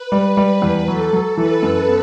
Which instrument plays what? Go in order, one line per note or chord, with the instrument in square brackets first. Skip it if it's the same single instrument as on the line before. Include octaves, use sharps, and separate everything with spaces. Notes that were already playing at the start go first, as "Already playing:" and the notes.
Already playing: [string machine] B4
[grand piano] G3
G3
E2
[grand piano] F#3 [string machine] A4
[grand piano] F#3
[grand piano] E3 [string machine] B4
[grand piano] F#2
B3